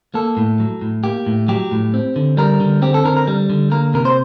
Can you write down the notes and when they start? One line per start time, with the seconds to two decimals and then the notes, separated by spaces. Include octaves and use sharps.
0.14 A#3 A4
0.37 A2
0.60 F#3
0.82 A2
1.04 A#3 G4
1.27 A2
1.48 F#3 G4
1.71 A2
1.94 C4
2.16 D3
2.37 G3 A#4
2.60 D3
2.82 C4 G4
2.94 A4
3.04 D3 A#4
3.17 A#4
3.27 G3
3.50 D3
3.71 A#3 A#4
3.94 C3 A#4
4.05 C5